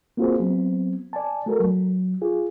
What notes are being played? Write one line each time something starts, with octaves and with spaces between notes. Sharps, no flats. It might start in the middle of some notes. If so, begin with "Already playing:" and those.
A#3 C4 F4 F#4 G#4 C5
F#3 B3 C4
D5 G#5 A5
A3 F#4 A4 A#4
F#3
F4 G#4